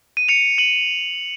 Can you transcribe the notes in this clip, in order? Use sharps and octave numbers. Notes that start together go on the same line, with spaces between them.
D#7
C#7 F7
D#7 F#7